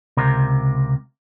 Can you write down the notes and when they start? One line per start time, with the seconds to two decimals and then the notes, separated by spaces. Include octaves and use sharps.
0.17 C#2 C3 A#4